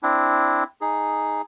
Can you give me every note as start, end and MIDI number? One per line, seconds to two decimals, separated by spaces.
0.03 0.64 60
0.03 0.64 62
0.03 0.64 64
0.81 1.42 63
0.81 1.42 68